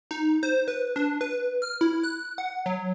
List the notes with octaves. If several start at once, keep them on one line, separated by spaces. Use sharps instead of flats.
D#4
C5
B4
D4
B4
F6
E4
F#6
F#5
F#3